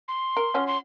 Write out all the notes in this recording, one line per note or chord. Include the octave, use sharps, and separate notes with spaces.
C6
A#4
F3 C#4 F#4
C6